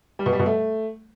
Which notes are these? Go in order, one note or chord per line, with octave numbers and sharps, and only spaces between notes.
G3
B2
G3
B2
A3